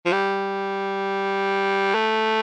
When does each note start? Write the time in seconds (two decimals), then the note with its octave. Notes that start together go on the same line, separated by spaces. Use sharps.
0.06 F3
0.12 G3
1.95 A3